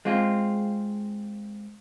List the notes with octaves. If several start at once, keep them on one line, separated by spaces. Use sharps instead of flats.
G#3 C4 F4